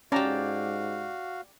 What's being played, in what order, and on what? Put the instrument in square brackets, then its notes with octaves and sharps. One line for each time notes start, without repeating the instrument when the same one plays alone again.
[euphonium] G#2 [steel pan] C#4 A5 A#5 [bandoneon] F#4 F5 [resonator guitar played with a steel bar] G4 D5